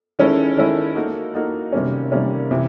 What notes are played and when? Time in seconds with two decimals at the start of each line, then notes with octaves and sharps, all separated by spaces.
0.19 D#3 G#3 C#4 E4 A4
0.57 D#3 G#3 C#4 E4 A4
0.95 A#3 D#4 F#4 A4
1.34 A#3 D#4 F#4 A4
1.72 C3 D#3 G3 A#3 C#4
2.12 C3 D#3 G3 A#3 C#4
2.51 C3 E3